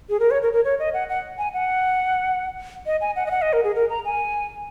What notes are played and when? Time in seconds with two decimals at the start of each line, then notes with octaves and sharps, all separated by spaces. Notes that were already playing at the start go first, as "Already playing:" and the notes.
0.10 G#4
0.20 A#4
0.31 C#5
0.42 A#4
0.53 A#4
0.64 C#5
0.79 D#5
0.94 F#5
1.09 F#5
1.38 G#5
1.54 F#5
2.86 D#5
3.01 G#5
3.16 F#5
3.26 D#5
3.31 F#5
3.42 D#5
3.53 A#4
3.64 G#4
3.75 A#4
3.90 A#5
4.05 G#5